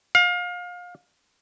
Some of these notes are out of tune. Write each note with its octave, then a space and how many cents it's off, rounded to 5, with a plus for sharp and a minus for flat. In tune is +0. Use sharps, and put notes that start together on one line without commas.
F5 +30